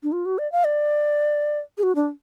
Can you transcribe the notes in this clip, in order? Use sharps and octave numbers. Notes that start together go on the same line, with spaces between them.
D4
F4
F#4
D5
F5
D5
G#4
F#4
D4